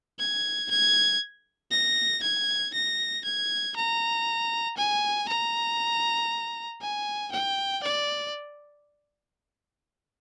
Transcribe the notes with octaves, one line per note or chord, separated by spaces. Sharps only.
G#6
G#6
A#6
G#6
A#6
G#6
A#5
G#5
A#5
G#5
G5
D5